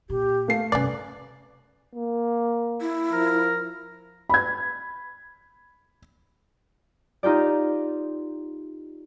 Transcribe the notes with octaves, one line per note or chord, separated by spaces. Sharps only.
A#2 G4
A3 F5 C7
G2 C3 C#4 B4 D5
A#3
E4
F3 A#4
B5 G#6
D#4 F4 G4 D5